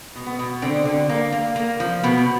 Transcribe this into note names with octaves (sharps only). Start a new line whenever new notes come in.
B2
B3
B2
D3 C4
D3
A#3
A#3
A#3
F3
B2 B3